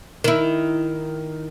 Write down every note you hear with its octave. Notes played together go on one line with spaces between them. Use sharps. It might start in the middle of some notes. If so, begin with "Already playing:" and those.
D#3 E4